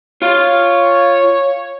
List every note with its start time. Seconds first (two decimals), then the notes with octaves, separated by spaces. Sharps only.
0.22 F4 C#5 F5